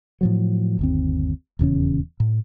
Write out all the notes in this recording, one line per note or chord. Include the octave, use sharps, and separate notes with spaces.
A2 F3 F#3
G1 D#2 C4
D#1 E2 C#3 C#4
A2